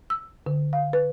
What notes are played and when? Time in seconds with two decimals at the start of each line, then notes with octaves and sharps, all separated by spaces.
0.10 E6
0.46 D3
0.73 F5
0.93 B4